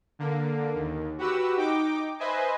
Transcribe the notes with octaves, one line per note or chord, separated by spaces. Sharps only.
D3 A#3
D#2
F#4 G4 B4 F#5 E6
D#4 G5 D6
B4 C5 D#5 E5 G#5